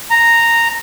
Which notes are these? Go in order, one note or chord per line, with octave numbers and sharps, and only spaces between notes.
A#5